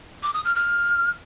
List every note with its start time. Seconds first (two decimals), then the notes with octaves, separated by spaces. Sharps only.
0.23 D6
0.34 D#6
0.44 F6
0.55 F6